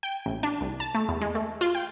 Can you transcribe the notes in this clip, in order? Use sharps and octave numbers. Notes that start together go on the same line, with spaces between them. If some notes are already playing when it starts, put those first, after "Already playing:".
G5
A1
D4
C2
A5
A3
E2
G#3
A3
F4
G5